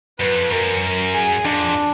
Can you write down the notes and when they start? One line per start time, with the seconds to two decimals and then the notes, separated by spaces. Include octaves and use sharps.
0.19 F#2 B4
0.35 F2
0.50 F#2 A#4
1.14 G#4
1.45 F2 D4